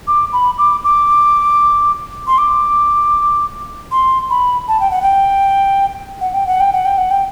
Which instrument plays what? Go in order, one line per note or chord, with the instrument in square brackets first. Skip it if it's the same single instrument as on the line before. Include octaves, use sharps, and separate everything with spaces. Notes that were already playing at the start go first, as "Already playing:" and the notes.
[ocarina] D6
B5
D6
D6
C6
D6
C6
B5
A5
G5
F#5
G5
F#5
G5
F#5
G5
F#5
G5
F#5
G5